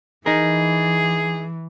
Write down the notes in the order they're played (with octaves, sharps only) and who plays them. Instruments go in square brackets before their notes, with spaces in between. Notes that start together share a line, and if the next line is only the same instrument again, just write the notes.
[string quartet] E3 [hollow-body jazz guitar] D#4 A#4 [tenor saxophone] G#4